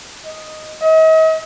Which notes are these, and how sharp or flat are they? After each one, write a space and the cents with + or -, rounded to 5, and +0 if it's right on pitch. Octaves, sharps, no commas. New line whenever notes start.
D#5 +0
D#5 +40